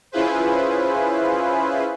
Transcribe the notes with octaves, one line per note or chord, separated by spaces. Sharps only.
C#4 E4 F4 G#4 B4 C5